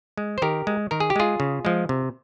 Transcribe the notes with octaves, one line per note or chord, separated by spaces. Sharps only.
G#3
C5
D#3 G4 A#4
G#3
D#3 A#4
G#4
G4
G#3 F4 G#4
C#3
F3 G#3
C3